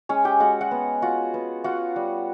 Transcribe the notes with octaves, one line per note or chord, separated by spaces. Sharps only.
G#3 C#4 C#5
G4 G5
G#3 F#4 F#5
F#4 F#5
B3
F4 F#4 F#5
B3
F4 F#4 F#5
G3